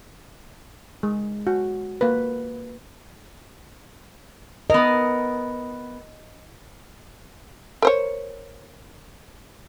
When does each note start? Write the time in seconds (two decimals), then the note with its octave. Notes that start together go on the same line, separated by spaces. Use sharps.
1.03 G#3
1.47 F#4
2.01 A#3 B4
4.70 B3 A#4 D#5
7.82 A#4 C5 C#5